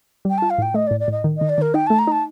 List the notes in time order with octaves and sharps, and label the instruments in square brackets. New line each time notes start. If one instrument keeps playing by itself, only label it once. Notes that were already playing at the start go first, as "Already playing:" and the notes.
[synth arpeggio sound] G3 [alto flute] G5
[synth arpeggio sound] F4 [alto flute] A5
[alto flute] F5
[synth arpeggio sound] A2 [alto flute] G5
[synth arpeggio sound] A3 [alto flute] D#5
[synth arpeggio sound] A2 [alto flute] D5
[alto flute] D5
[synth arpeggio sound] A2 [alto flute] D#5
[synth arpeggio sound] D#3
[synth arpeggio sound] D#3 [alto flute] D#5
[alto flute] D5
[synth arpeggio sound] D#3 [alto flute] A#4
[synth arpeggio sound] D#4 [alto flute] G5
[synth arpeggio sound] A3 [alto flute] A5
[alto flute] A#5
[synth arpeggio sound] D#4 [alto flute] A5